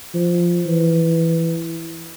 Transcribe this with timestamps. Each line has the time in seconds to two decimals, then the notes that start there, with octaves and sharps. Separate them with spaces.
0.14 F3
0.66 E3